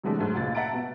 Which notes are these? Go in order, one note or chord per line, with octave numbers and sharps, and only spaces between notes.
C3 E3 F#3 G#3 A3 D4
G#2 F#3 A3
C#2 A#2 A6
E5 F#5 A5 A#5 A6 D7
B2